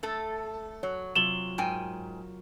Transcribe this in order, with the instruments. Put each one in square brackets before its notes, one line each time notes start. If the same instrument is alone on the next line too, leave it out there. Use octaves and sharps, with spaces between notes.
[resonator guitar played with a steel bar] A3 A4
[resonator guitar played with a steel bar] F#3 [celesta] C#5
[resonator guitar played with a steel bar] C3 [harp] F#3 F4 [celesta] E7 F#7 G7
[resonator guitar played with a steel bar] G#2 G5 G#5 [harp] A#4